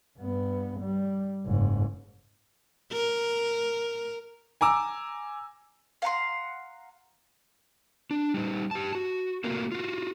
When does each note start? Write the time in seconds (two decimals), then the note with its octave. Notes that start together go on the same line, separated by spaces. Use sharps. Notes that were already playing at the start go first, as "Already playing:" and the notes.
0.19 G2 B3
0.80 G3
1.46 F#1 G#2
2.92 A#4
4.61 G#5 A#5 D6 E6
6.02 F5 F#5 A#5 C6
8.11 D4
8.34 G3 D#4
8.71 G4 A5
8.95 F#4
9.44 A3 A#3 F4 F#4 A#4
9.72 F4 F#4